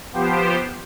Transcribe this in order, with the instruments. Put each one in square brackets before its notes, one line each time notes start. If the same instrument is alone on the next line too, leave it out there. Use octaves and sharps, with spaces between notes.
[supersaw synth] F3 B3 G4 C5